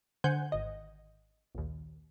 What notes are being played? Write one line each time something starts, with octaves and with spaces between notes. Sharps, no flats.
D3 C5 F#5 G#5 G6
G#1 D#5
A#1 D#2